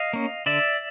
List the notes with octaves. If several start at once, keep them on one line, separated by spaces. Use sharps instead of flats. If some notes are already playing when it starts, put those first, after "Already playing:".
Already playing: D#5 F5
A#3 C#4
D3 D5 E5